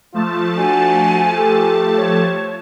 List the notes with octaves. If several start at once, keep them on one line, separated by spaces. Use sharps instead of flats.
F3 A3 F4 A5
D4 F#4 G#5
G4 A4
C#5